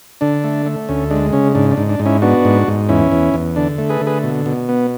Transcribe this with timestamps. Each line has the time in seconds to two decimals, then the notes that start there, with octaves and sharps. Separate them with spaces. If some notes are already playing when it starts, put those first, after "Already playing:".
0.21 D3 D4
0.44 A3
0.66 A3
0.89 D2 C#4
1.11 G#3 D4
1.33 C#3 C#4
1.55 G#2 D4
1.71 D4
1.77 G#2
1.89 D4
1.99 G#2
2.05 C#4 E4
2.22 B3 D4 F#4
2.45 G#2
2.68 G#2
2.89 E2 C#4 E4
3.11 E2
3.34 E2
3.56 D3 D4
3.78 A3
3.89 G#4 B4
4.01 D3
4.07 G#4 B4
4.24 B2
4.46 B2
4.69 B3